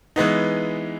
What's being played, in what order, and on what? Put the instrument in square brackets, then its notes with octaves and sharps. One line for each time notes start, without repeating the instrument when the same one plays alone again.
[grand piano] E3 G#3 B3 D#4